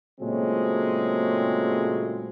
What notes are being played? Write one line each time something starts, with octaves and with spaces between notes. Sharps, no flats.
A#2 C#3 F#3 G#3 A3 C4